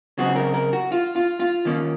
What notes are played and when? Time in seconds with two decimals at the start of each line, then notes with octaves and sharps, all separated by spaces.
0.18 C#3 F#3 C4 D#4 F#4
0.36 A#4
0.54 A#4
0.73 F#4
0.92 F4
1.16 F4
1.40 F4
1.65 D#3 A#3 C#4